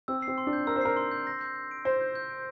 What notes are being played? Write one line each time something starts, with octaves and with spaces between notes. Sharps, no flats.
C4 E6
C7
C4
C6
D4
G6
A#4 E6
C5
A#4 C7
C6
G6
A#6
G6
G6
D7
C5 A#6
G6
G6
D7